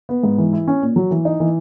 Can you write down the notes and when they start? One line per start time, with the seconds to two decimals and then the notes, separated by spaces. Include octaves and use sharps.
0.09 B3
0.23 G#2
0.38 E3
0.53 E4
0.68 C#4
0.82 A#2
0.96 F#3
1.11 E3
1.25 D#4
1.40 E3